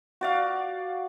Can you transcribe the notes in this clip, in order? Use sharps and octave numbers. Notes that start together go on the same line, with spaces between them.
F#4 D5 F5